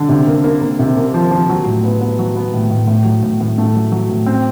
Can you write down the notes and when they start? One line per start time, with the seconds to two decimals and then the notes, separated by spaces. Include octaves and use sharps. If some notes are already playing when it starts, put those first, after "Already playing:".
Already playing: D3
0.09 C3
0.27 A#3
0.44 A#3
0.61 A#3
0.79 C3
0.97 A#3
1.14 F3
1.31 F3
1.49 F#3
1.65 A2
1.84 B3
2.01 B3
2.19 F#3
2.36 B3
2.54 A2
2.70 A2
2.88 A2
3.05 F#3
3.23 A2
3.41 A2
3.58 A3
3.75 F#3
3.92 F#3
4.09 A2
4.26 C4